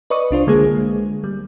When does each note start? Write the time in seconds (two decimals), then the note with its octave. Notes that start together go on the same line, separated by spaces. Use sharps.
0.10 B4 D5 D#5 C#6 D#6
0.31 C2 D4 F4 C5
0.47 D3 G#3 A#3 G#4
1.24 G3